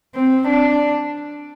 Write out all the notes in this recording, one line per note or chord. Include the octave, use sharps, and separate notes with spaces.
C4
D4